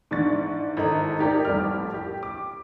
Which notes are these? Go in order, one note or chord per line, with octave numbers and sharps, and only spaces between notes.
G#2 E3 D4 C#6 A6
G#1 E4 A4 D#5 A#5
D#4 G4 A#4 D5
A1 F2 G3 A4 D6 F6
G4
D6